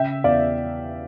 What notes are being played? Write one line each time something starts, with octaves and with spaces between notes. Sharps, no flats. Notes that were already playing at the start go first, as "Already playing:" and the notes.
Already playing: C#3 E5 G5
E2 D5 F5